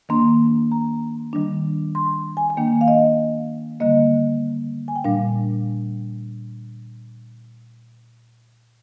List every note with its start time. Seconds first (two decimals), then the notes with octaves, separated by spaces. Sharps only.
0.09 D#3 A#3 D4 C6
0.72 A#5
1.33 D#3 G3 D4
1.95 C6
2.37 G#5
2.50 G#5
2.57 D#3 A#3 D4 G5
2.81 F5
2.88 D#5
3.80 D3 G3 A#3 D#5
4.88 G#5
4.96 G5
5.04 A#2 G3 D4 F5